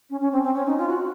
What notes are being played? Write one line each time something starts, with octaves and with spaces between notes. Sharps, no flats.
C#4
C#4
C4
C4
C#4
D#4
F4
F#4